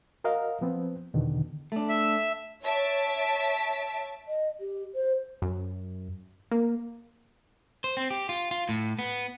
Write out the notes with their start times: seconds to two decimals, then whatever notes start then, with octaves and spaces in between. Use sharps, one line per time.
0.24 F#4 A#4 D#5 F5
0.61 F3 B3 C4
1.14 E2 B2 D3 D#3
1.72 A3 D4
1.89 E5
2.64 C#5 E5 A5 B6 D7
4.28 D#5
4.60 G4
4.94 C5
5.42 F#2
6.51 A#3
7.84 C5
7.97 C4
8.11 G4
8.29 F4
8.51 F4
8.69 A2
8.99 B3